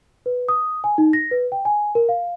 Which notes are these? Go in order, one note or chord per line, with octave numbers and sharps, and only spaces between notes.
B4
D#6
G#5
D#4
A#6
B4
G5
G#5
A#4
F5